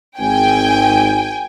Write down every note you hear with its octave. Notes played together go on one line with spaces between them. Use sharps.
G#1 G5 G#5